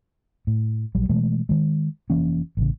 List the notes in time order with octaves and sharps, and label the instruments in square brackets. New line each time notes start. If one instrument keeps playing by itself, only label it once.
[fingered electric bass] A2
A#1 F#3 G3
B2 E3 G#3 A3
D#3 G#3
F1 E3 A#3 C#4
A1 C#3